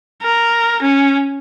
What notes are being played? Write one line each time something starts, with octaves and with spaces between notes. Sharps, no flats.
A#4
C#4